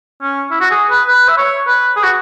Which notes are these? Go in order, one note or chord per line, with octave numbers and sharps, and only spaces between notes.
C#4
E4
F#4
G#4
B4
B4
E5
C#5
B4
G#4
F#4